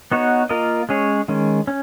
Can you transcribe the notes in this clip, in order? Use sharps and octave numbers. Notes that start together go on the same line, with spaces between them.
B3 D#4 F#4 C#5
A#3 F4 A#4 D#5
G#3 C#4 G#4 C#5
D#3 G#3 C#4
C#4